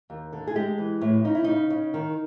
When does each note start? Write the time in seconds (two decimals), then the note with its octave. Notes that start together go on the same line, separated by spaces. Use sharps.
0.10 D#2
0.33 D3
0.47 G#4
0.56 G#3 G4
0.78 E3
1.01 A2
1.24 C#3 D#4
1.35 E4
1.44 C#3 D#4
1.70 C#3
1.94 D#3